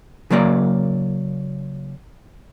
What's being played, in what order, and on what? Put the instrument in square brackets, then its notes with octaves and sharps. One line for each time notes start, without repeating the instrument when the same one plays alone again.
[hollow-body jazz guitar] C#3 F#3 A#3 D5 A#5